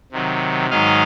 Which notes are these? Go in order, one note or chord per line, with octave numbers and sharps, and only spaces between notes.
C3 D#3 F#3
G#2 D#3 F#3 D#5 F5